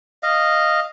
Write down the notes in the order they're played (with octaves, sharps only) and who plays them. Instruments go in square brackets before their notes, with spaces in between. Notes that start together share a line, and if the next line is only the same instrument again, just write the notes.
[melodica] D#5 F5